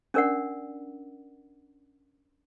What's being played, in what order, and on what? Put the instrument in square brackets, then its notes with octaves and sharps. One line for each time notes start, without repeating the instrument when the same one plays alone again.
[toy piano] C#4 D4 A#4 D5 F#5